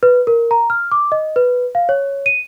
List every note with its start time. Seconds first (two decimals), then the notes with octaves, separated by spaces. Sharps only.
0.03 B4
0.27 A#4
0.51 A#5
0.70 F6
0.92 D6
1.12 D#5
1.36 B4
1.75 F5
1.89 C#5
2.26 D#7